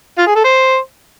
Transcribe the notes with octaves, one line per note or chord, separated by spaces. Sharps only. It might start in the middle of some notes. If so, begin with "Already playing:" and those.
F4
G#4
A4
C5